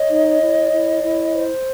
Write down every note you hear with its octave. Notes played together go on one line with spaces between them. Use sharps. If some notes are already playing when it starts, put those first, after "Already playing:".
Already playing: C#5 D#5
D#4
E4
E4
E4
C5